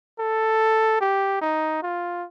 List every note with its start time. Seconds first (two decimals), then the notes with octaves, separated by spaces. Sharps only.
0.20 A4
1.01 G4
1.42 D#4
1.83 F4